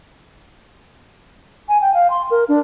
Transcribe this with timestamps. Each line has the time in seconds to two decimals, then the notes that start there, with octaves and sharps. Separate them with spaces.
1.69 G#5
1.81 G5
1.94 F5
2.10 C6
2.31 A#4
2.48 D4